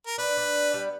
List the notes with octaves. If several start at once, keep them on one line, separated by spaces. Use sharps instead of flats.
A#4
D4 B4
D4
B3
G3